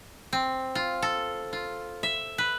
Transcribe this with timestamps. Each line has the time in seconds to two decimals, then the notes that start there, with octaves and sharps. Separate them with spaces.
0.33 C4
0.75 F4
1.02 A4
1.53 F4
2.03 E5
2.38 B4